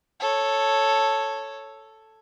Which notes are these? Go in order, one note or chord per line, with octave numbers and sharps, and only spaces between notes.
A4 C#5